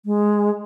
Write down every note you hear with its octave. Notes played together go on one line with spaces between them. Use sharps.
G#3